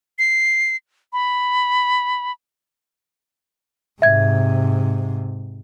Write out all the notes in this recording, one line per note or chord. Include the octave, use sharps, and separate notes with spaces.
C7
B5
G#2 C3 E5 G#6